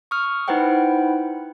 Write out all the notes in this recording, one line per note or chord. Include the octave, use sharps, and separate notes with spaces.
C#6 D#6 F6
D#4 E4 B4 C5 F#5 G5